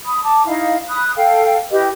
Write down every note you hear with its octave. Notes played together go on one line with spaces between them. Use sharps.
B5 D#6
A5 D6
D#4 E4 F5
B5 D#6 F#6
A4 F5 G5
E4 G4 B4 D#5